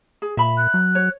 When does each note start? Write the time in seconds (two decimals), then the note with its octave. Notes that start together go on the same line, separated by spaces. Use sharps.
0.22 G#4
0.37 A#2 E5 B5
0.57 F#6
0.74 F#3
0.95 C#5